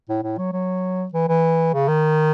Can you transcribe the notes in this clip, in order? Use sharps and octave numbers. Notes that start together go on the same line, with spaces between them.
A2
A2
F#3
F#3
E3
E3
C#3
D#3